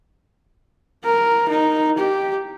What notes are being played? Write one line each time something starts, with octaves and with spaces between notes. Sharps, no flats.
A#4
D#4
G4